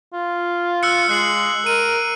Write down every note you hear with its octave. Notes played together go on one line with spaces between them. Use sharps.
F4
E6 F#6 C#7
G#3 F#6 C7 F#7
A#4 D#7